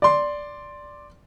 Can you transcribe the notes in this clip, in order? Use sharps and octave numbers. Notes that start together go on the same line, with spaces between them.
D5 C6